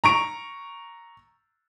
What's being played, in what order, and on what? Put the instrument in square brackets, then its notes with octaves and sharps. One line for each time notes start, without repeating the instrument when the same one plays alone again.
[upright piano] A#5 C#6 D7